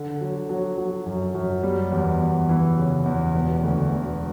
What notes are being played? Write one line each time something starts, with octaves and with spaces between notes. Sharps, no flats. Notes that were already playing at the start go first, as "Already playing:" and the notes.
Already playing: D3
F#3
F#3
F#3
F#2
F#2
G3
E2
E2
E3
C#3
E2
E1
D2
E1